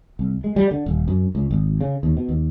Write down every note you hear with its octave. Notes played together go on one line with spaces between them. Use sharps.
C2
G#3
G3
D3
D#1
F#2
C#2
G#1
C#3
D#2
B2
D#2